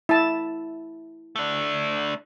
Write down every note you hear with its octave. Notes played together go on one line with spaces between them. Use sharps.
E4 A5
A3 D4